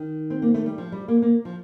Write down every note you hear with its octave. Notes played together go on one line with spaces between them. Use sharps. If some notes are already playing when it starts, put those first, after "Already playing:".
Already playing: D#3
C4
A#3
A3
G3
F3
G3
A#3
A#3
F3